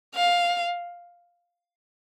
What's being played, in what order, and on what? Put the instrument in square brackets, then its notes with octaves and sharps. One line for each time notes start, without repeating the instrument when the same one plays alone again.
[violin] F5